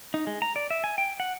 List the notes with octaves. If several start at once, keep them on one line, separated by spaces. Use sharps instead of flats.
D#4
G#3
A#5
D5
E5
G#5
G5
F#5